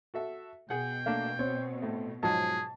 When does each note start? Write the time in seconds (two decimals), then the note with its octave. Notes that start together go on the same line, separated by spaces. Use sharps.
0.14 F#4 A4 E5
0.70 B2 G#4 F#5 G5
1.06 A3 A#3 D4 F5
1.39 C4 C#5
1.82 A2 A3
2.23 G#2 F3 F#3 G#4 A5